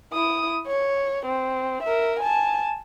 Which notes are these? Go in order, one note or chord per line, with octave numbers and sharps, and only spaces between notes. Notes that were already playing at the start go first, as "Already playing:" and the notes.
E4 D#6
C#5
C4
A#4 E5
G#5 A5